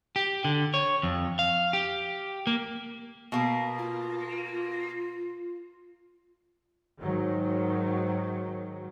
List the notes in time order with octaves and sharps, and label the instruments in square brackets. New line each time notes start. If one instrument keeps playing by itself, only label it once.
[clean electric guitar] G4
D3
C#5
F2
F5
G4
A#3
[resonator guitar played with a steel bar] B2 A#3
[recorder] F4
[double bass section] G#2 D#3 F#3